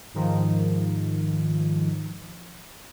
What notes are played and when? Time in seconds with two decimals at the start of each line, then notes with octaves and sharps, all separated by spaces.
0.14 G#2 D#3 F3